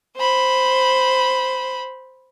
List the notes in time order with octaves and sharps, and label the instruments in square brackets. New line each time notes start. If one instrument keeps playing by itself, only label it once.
[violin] C5 B5